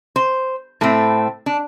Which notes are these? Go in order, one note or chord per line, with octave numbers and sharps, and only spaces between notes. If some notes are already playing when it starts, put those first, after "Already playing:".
C5
A2 A3 C4
D4